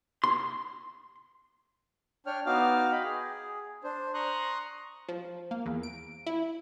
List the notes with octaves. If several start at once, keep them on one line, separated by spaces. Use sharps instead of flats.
C6
D4 C#5 G5 F6
B3 D#4 F#4 F5 D6 F6
D#5 G5 B5
G#4
D4 C5
A#5 C6 C#6 D#6 F#6
F3
A#3
E2
D7
E4